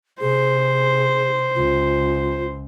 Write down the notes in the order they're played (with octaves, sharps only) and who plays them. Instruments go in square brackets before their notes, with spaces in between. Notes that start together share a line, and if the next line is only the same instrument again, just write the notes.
[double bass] C3 [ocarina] G#4 [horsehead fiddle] C5
[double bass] C#2 [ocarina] F4